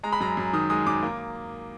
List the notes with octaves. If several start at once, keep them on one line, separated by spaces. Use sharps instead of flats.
G#3 A#5
B5
F#2 A#5
F#2
D#3 D#6
G#3 D#6
F#2 D6
A#3